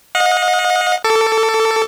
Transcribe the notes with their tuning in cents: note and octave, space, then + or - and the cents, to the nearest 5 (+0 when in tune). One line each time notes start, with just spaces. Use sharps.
D#5 +10 F#5 -40
A4 +15 D6 -35